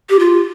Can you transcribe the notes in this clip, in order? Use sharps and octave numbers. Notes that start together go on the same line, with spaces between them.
G4
F4